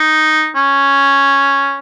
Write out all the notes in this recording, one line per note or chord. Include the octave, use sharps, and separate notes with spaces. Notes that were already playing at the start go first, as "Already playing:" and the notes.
Already playing: D#4
C#4